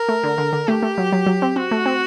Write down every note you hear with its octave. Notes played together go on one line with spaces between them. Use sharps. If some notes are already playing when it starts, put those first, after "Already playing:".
Already playing: A#4
A3
D3
D3
D3
A3 G4
A3
F#3
F#3
F#3
C4
C4 F#4
A3
C4